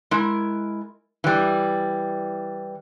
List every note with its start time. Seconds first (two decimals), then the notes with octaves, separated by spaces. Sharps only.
0.11 G#3 E4 A#4
1.24 E3 G3